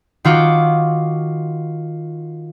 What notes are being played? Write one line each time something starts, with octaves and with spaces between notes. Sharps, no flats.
D#3 F4 F#4 D6